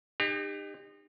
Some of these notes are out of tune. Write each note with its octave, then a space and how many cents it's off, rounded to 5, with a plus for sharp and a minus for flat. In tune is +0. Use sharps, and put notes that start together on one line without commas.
D#4 -30 G4 +35